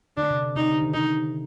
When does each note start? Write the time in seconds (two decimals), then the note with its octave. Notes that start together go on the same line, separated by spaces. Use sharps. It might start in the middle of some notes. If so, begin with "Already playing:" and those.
0.17 D3 D4
0.30 C3
0.42 C3
0.56 C3 D#4
0.69 D3
0.81 D#3
0.94 C3 D#4